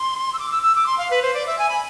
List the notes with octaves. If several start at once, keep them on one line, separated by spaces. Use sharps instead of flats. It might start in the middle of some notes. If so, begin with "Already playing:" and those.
Already playing: C6
E6
D6
E6
E6
D6
C6
F5
B4
C5
D5
E5
G#5
B5